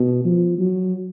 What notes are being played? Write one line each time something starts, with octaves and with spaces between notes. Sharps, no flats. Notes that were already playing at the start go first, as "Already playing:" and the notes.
Already playing: B2
F3
F#3